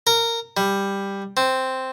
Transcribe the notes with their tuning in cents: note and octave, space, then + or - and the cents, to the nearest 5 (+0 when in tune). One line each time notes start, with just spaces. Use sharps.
A#4 -15
G3 +10
C4 -5